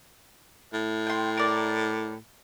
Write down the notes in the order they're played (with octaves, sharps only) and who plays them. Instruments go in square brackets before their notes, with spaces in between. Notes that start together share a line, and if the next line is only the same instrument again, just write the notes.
[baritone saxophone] A2
[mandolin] G5 C6
A#4 D5